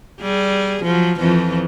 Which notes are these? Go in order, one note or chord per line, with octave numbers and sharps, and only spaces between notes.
G3 G#4
F3 F#3
F2 E3 F3